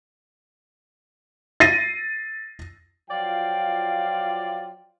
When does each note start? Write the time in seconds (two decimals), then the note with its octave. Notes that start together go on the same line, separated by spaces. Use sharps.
1.60 A6 A#6 C7 D#7
3.10 F3 F#3 F4 D5 F5 G5